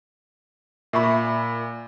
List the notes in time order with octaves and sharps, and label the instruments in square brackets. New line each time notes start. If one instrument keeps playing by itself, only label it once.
[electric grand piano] A#2 B5 [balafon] E5 C#6